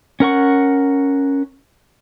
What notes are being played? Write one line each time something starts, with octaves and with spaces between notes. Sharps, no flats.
C#4 A#4 F#5 C#6